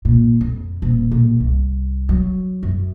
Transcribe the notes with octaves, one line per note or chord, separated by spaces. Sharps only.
A#2
F2
D#1
A#1
C2
F#3
F#2